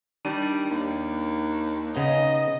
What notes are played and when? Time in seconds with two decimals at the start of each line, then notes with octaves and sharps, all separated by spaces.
0.25 D#3 G3 D4 D#7
0.71 D#2
1.95 C#3 B3 D#4 D#5